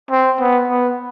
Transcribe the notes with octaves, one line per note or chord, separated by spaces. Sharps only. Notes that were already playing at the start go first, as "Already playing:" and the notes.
C4
B3
B3